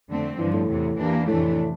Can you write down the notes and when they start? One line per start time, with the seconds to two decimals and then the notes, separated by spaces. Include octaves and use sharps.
0.09 F2 D3 A3 C4
0.38 G2 D3 E3 F3
0.53 A2
0.68 E2 C3 E3
0.98 E2 E3 A#3 D4 G4
1.27 F2 A2 C3 E3 A3 D4